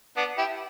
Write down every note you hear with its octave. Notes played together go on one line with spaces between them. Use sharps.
B3 D4
E4 G4